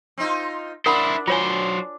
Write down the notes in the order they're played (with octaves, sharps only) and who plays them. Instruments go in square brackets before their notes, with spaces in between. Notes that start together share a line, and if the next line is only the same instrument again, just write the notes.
[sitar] C4 D#4 F4
[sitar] D4 [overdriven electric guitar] E4 C5 [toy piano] A#4 F#5 B5
[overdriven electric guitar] F#3 C5 [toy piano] F4 C#5 G#5